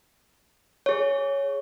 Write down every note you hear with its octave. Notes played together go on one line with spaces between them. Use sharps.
G#4 C#5